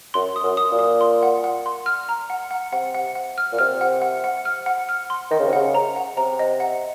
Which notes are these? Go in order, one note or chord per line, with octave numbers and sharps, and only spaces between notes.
F#2 C6
D#6
F#2
D#6
A#2
D#6
C6
F#5
F#5
C6
F6
A#5
F#5
F#5
C3 F#5
F#5
F#5
F6
A#2
C3 F6
F#5
F#5
F#5
F6
F#5
F6
C6
D#3 D#5
C#3
C3
C#3 F#5
A#5
F#5
C3 A#5
D#5
F#5